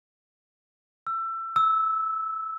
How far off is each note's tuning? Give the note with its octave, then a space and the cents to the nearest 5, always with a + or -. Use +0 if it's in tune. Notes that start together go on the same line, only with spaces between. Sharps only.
E6 +25
E6 -15